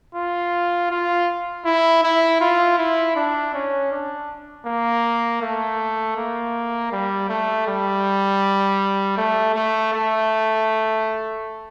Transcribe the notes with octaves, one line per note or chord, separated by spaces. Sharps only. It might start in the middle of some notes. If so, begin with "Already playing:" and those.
F4
F4
E4
E4
F4
E4
D4
C#4
D4
A#3
A3
A#3
G3
A3
G3
A3
A3
A3